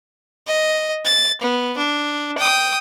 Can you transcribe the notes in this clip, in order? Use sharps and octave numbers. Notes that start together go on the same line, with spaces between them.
D#5
A6
B3
D4
G5 D#6